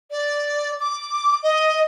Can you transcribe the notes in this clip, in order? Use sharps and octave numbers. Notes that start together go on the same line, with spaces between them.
D5
D6
D#5